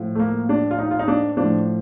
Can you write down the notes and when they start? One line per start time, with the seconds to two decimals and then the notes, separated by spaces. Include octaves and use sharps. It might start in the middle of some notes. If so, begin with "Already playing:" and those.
Already playing: A2 F3
0.15 A3
0.20 A#3
0.49 D4
0.71 F4
0.79 D#4
0.91 F4
0.99 D#4
1.08 D4
1.37 A2 F3 D4